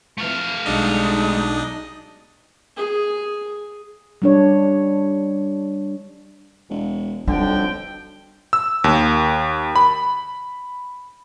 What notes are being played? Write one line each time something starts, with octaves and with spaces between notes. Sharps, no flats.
F2 E3 A3 F5
B1 G3 G#3 D4 D#4 D#5
G#4
G3 D4 C#5
E1
B1 F2 D3 G3 G5
E6
D#2
B5